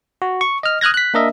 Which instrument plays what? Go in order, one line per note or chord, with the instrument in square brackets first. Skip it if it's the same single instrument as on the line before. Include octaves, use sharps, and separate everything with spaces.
[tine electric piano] F#4
C#6
D#5 F6
D#6 F6 F#6 G#6 A#6
F#6 B6
A#3 D4 A#4 D#5 E5